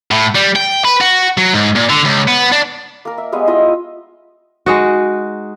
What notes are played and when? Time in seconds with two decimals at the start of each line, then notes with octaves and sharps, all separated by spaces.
0.11 A2
0.35 G3
0.56 G5
0.85 B4
1.01 F#4
1.38 F#3
1.54 G#2
1.76 A#2
1.90 D3
2.05 C#2
2.28 B3
2.52 D4
3.05 A#3 A#4
3.18 E5
3.32 G3 G#3 B3 F5
3.47 E4 F4 D#5 E5
4.66 G#3 D#4 F#4